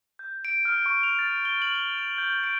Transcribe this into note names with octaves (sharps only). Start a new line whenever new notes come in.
G6
D7
F6
C#6
F7
A6
G7
F#7
F#7
F7
G6
D7